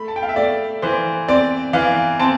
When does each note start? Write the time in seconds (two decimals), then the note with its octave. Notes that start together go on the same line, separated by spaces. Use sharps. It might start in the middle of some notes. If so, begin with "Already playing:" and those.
Already playing: A3 B5
0.08 A5
0.16 G5
0.23 F5
0.29 E5
0.36 A3 D5
0.82 E3 C5
1.28 C4 D5
1.73 E3 F5
2.19 C4 A5